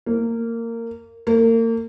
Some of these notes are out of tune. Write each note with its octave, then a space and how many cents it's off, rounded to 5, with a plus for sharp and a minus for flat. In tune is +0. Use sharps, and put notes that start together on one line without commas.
A#3 -20
A#3 -35